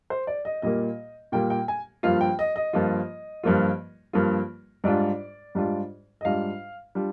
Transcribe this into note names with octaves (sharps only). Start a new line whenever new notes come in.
C5
D5
D#5
A#2 G3 A#3 D#5
A#2 G3 A#3 G5
G5
G#5
G2 F3 A#3 F4 F5
G5
D#5
D#5
G2 F3 A#3 F4
G2 F3 A#3 F4
G2 F3 A#3 F4
G#2 G3 D4 F4 D5
G#2 G3 D4 F4
D#5
G#2 G3 D4 F4 F5
G3 D4 F4